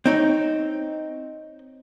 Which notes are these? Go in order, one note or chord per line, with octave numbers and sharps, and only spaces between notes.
C4 D#4 C#5